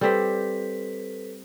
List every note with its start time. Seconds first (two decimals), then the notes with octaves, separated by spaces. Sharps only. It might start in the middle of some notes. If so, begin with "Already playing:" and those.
0.01 G3 C4 G4 A4 B4 B6